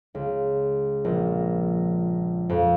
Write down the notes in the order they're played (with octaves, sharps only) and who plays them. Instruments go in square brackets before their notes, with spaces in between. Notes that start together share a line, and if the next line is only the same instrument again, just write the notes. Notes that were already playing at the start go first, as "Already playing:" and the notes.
[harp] C#2
A#1
F2